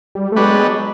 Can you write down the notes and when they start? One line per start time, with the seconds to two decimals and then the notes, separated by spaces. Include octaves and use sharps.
0.15 G3
0.32 A3
0.36 F#3 G#3 B3 D4 G4 B4